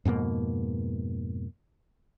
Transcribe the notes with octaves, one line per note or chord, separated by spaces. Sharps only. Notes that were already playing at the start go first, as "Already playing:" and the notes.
F2 G#2 B2 A#3